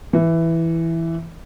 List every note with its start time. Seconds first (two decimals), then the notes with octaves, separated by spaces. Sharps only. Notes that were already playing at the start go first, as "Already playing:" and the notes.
0.13 E3